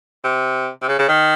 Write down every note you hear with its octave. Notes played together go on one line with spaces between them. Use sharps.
C3
C3
C#3
C#3
D#3